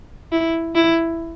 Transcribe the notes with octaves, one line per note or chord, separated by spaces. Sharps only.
E4
E4